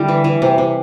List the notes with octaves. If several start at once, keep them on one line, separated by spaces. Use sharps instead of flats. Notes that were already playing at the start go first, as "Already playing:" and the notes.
Already playing: D3 G3 E4
E3
E3
C3
C3